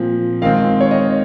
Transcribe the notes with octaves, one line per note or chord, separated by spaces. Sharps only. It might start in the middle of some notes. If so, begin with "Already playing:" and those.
Already playing: A#2 F3 C4
D#3 G#3 C4 F5
C#5
D#5